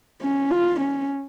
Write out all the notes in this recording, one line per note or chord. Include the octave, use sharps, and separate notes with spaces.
C#4
F4
C#4